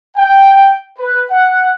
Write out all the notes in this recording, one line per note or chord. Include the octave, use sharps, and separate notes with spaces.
G5
B4
F#5